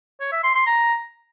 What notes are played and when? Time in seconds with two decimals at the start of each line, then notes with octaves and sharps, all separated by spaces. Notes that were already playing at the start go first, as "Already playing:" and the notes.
0.20 C#5
0.32 E5
0.43 C6
0.55 C6
0.67 A#5